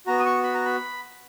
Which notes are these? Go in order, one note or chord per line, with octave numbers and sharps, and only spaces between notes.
B3 F#4 A#5
D#6
C#6
B5
A#5
B5